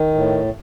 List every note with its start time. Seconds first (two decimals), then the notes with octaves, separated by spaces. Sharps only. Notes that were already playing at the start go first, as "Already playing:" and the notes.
Already playing: D#3
0.15 A2